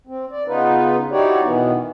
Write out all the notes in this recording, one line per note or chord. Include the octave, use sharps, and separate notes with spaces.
C4
D5
C#3 B3 D#4 F4 B4
D#4 E4 F#4 G4 C#5 D5
B2 D#3 E3 B3